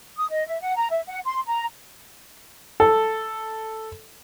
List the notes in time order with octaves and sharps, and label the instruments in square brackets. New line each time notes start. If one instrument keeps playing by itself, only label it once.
[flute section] D#6
D#5
E5
F#5
A#5
E5
F#5
C6
A#5
[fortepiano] A4